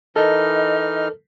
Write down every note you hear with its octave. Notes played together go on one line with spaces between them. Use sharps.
E3 D#4 A4 A#4 D#5 F6